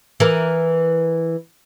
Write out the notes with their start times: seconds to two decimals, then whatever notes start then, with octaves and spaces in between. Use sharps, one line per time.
0.20 E3 A#4